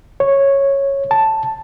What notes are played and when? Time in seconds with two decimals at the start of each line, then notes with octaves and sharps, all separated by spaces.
0.20 C#5
1.11 A5